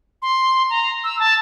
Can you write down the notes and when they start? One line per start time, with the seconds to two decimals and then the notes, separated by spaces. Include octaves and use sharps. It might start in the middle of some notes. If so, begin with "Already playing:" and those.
0.22 C6
0.70 A#5
1.04 E6
1.19 A5